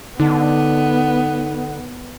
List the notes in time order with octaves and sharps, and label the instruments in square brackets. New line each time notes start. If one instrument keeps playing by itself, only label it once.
[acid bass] D3 [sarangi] B3 [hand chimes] D#4